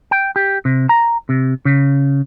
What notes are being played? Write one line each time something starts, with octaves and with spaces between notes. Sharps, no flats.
G5
G4
C3
A#5
C3
C#3